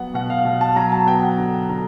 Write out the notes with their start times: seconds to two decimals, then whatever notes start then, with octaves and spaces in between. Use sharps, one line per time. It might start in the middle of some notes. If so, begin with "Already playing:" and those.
Already playing: F#3 B3 F#5
0.14 B2 F#5
0.30 F5
0.45 B2
0.61 A5
0.76 F#3 A#5
0.92 A5
1.06 B3 G5
1.23 F#5
1.37 D3 A#5
1.69 D3 A#5